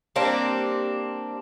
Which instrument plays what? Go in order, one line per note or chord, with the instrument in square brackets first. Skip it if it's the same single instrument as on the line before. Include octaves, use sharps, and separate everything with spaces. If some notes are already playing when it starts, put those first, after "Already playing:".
[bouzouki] G3 A#3 C4 D4